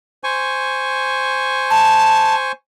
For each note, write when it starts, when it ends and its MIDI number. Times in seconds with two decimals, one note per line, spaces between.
0.24 2.52 72
0.24 2.52 80
0.24 2.52 85
1.70 2.35 81